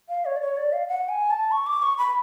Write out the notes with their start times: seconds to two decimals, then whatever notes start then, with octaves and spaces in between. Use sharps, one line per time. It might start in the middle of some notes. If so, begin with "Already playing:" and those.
0.09 F5
0.25 C#5
0.36 D5
0.41 C#5
0.57 D5
0.72 F5
0.88 F#5
1.09 G#5
1.31 A5
1.51 C#6
1.67 D6
1.82 C#6
1.98 B5